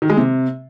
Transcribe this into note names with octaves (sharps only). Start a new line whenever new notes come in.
D#3
G#3
C3